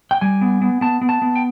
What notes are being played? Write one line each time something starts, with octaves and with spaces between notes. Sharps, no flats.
G5
G3 G#5
B3
B3
B3 A5
B3
A5
B3
G5